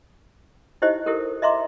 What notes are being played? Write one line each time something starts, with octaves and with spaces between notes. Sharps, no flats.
D#4 E4 G4 C5 D#5
E4 G4 A4 A#4
D#5 E5 A#5 C6 D6